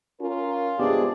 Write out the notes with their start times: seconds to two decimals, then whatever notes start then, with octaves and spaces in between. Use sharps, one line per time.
0.21 C#4 F4 A#4
0.79 G2 C3 G#3 B3 D4 G4 G#4 D5